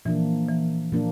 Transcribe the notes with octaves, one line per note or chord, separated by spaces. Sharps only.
A#2 E3 F3 A#3 D4
E3
A#2 F3 A#3 D4